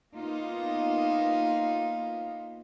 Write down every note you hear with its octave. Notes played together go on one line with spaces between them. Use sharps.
A#3 B3 D#4 F4